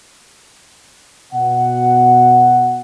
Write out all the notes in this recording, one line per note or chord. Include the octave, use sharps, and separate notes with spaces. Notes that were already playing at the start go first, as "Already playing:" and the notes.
B2 F#5